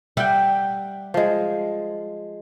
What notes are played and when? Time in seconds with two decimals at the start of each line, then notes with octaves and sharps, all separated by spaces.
0.17 G3 E5 F#5 G5
1.14 F3 G#3